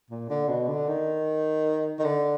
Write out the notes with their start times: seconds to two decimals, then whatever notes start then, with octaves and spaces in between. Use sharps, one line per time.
0.10 A#2
0.30 D3
0.49 B2
0.68 D3
0.88 D#3
1.99 D#3
2.04 D3